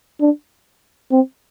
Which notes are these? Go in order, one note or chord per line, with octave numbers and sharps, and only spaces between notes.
D4
C4